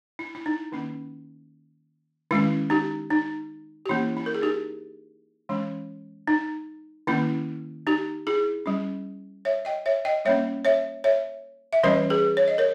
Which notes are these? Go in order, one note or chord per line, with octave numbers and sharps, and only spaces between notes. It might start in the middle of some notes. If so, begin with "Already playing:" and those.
E4
E4
D#4
D#3 A#3 C#4
D#3 G#3 C#4 E4
D#4 G4
D#4
G4
E3 A#3 C#4 E4
E4
A#4
G#4
D#4 G4
E3 G#3 C#4
D#4
D#3 A#3 C#4 E4
D#4 G4
E4 G#4
G3 C#4
C#5 E5
D#5 G5
C#5 E5
D#5 G5
G3 A#3 C#4 C#5 E5
C#5 E5
C#5 E5
E5
E3 G3 C#4 B4 D#5
G#4 B4
C#5
D#5
A#4 C#5